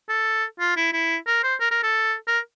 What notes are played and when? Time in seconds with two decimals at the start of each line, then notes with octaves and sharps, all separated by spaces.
0.09 A4
0.60 F4
0.76 E4
0.93 E4
1.27 A#4
1.43 C5
1.60 A#4
1.71 A#4
1.83 A4
2.27 A#4